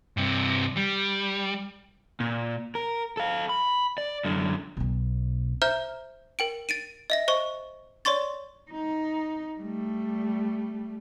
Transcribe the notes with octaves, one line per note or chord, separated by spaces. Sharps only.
G2 C3
G3
A#2
A#4
A4 F5
B5
D5
F#2 D3
B1 B2
C5 E5 A#5 F6 G6
A#4 G5 D7
A6 D7 D#7
D#5 E5 A#6
C5 D#5 C#6
C#5 D5 C6 C#6 A6
D#4
G3 A3